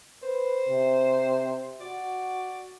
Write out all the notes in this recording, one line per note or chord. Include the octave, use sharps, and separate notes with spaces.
B4 C5
C3
F#4 D5